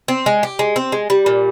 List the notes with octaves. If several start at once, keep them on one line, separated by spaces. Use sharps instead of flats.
C4
G#3
G4
G#3
C4
G#3
G3
A#2